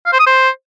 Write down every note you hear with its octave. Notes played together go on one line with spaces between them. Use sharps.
F5
C5
D#6
C5